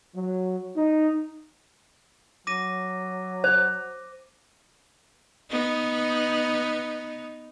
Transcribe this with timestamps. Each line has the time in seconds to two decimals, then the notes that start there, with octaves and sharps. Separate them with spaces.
0.14 F#3
0.77 D#4
2.47 F#3 D6 A#6 D#7
3.44 C5
5.50 B3 D#4